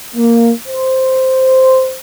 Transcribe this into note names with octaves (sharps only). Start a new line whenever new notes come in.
A#3
C5